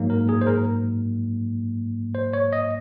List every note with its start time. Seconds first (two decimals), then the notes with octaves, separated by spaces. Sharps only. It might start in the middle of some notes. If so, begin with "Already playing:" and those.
Already playing: G#2 F#3 A#3
0.10 A#4
0.29 G#4
0.41 C5
0.47 A#4
2.15 C5
2.33 C#5
2.53 D#5